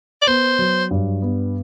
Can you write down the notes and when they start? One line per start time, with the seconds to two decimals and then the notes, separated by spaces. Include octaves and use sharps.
0.22 D5
0.27 B3 C5
0.59 F#3
0.91 G2
1.22 B3